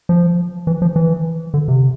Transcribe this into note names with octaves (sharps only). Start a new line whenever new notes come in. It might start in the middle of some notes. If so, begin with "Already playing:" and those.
F3
E3
F3
E3
D3
C3